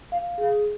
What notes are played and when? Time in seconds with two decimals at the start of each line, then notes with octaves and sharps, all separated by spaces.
0.12 F5
0.38 G#4